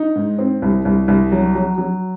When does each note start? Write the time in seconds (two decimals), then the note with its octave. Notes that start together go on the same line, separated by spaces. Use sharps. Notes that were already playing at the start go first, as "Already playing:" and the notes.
Already playing: D#4
0.16 G#2
0.39 C4
0.62 C2
0.85 C2
1.08 C2
1.32 F#3
1.55 F#3
1.78 F#3